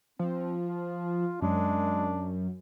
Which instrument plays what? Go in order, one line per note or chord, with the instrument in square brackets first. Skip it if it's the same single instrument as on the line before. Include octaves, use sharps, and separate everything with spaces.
[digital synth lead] F3 [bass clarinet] C4
[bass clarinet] F4
[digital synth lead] F#2 [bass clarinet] G#3 [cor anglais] D4